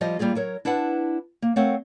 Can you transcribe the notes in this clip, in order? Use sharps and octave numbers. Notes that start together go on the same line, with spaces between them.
F3 G3 F4 D#5
G3 A#3 F4 G#4
F#3 A#4 C#5
D4 E4 B4 F#5 A5
A#3
A3 C4 A#4 C#5 F5 F#5